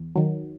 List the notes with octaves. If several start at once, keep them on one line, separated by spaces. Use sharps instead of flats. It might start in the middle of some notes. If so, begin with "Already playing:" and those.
Already playing: E2
D#3 F#3